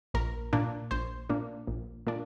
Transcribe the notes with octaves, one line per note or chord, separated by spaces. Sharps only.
A#1 A#4
A#2 A#3 D4
A#1 C5
A#2 A#3 D4
A#1
A#2 A#3 D4